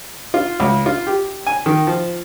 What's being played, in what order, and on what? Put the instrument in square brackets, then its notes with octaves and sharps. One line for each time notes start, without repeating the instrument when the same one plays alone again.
[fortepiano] F4
C#2
F4
G4
G#5
D#3
F3